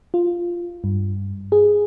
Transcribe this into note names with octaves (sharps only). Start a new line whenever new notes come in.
F4
G2
G#4